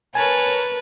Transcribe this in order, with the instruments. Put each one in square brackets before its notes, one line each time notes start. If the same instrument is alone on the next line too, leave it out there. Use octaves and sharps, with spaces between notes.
[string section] A#4 C#5 A5 [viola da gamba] B4 [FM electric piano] G#5